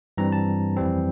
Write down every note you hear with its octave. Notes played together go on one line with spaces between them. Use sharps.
G2 E3 G3 C4 A#5
A5
F2 E3 G3 C4